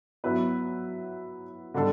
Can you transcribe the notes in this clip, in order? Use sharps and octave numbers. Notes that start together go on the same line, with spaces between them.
F#3 B3 E4 B4
D3 G3 D4 A4